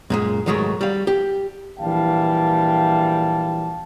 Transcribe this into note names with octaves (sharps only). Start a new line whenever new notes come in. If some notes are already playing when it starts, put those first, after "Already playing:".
F#2 A#2 G#3
C2 G#2 D#3 F#3 G#3 A3
G3 F5
G4
A#1 E3 G3 F5 G5 A5